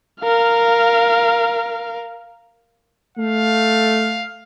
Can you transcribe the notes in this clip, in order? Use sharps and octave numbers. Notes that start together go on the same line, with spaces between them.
A#4 F5
A3 F5